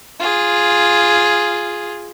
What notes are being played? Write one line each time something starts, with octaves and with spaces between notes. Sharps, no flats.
F4 G#4